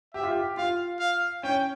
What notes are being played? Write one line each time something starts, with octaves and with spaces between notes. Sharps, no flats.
G4 E5
F4
G4
F4 F5
F5
C#4 G5